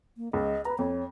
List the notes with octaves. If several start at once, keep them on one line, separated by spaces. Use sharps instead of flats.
A#3
C#2 D#5
B4 A#5 B5
F2 C#5